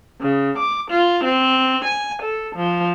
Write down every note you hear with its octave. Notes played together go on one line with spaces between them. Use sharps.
C#3
D6
F4
C4
G#5
A4
F3